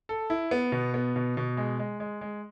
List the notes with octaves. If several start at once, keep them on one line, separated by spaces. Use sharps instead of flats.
A4
E4
B3
B2
B3
B2
B2
G#3
G#3
G#3
G#3